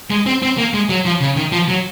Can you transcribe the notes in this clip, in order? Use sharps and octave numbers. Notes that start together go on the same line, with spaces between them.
G#3
C4
C4
A#3
G#3
F#3
F3
C#3
D#3
F3
F#3